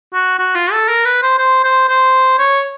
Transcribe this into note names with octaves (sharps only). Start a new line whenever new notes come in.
F#4
F#4
F4
A4
A#4
B4
C5
C5
C5
C5
C#5